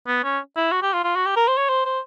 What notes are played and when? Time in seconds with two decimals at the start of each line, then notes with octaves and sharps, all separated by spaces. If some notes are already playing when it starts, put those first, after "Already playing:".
0.07 B3
0.24 C#4
0.56 E4
0.72 F#4
0.82 G4
0.93 F4
1.04 F4
1.16 F#4
1.26 G4
1.36 A#4
1.48 C5
1.57 C#5
1.69 C5
1.85 C5